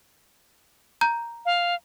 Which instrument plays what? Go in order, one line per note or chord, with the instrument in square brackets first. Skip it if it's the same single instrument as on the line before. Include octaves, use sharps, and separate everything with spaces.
[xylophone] A#5 G6
[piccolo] F5